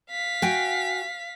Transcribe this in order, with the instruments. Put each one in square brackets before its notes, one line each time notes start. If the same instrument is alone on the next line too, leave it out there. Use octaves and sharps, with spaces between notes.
[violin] F5 B6
[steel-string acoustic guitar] F#4 G5 G#5